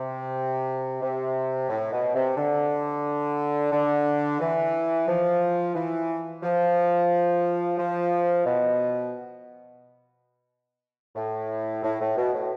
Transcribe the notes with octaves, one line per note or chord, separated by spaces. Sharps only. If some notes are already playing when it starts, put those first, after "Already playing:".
Already playing: C3
C3
A2
B2
C3
D3
D3
E3
F3
E3
F3
F3
B2
A2
A2
A2
B2
A2